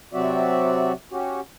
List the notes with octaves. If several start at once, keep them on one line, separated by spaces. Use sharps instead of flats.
C3 F#3 C4 F#4 D5 E5
C#4 F#4 G4